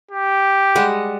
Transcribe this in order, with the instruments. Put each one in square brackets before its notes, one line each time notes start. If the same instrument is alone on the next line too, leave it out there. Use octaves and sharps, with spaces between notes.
[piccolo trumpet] G4
[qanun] G3 G#3 F#5